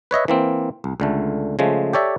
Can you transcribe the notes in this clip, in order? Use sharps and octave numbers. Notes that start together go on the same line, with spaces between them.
B4 C#5 D#5 E5
E3 A#3 C4
C2
C#2 D3 A3
C#3 F3 G#3 A3
G4 A4 C#5 D5 E5